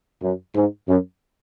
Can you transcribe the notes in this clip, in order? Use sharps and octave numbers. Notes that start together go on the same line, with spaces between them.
F#2
G#2
F#2